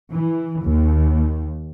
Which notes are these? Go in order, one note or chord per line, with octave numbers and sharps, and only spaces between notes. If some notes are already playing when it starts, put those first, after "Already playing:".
E3
D#2